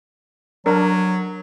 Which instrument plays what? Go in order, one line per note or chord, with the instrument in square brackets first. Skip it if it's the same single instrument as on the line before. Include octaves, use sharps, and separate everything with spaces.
[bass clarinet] F#3 [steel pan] D4 A#4